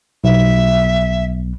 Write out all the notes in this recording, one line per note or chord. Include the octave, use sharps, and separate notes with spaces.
B1 E5